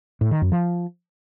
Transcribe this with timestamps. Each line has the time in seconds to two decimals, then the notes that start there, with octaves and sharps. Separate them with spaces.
0.21 A2
0.31 D#3
0.42 F#2
0.52 F3